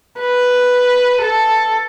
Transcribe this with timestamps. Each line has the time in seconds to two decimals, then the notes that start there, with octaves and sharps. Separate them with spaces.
0.20 B4
1.21 A4